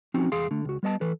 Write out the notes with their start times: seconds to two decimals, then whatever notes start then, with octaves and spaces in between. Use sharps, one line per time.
0.14 F3 C4 C#4 D#4 F#4
0.32 E2 G#4 F5 C6
0.51 D3 A3
0.65 C#2 F#4
0.83 G3 B3 D#5 A5
1.01 E3 A4 B4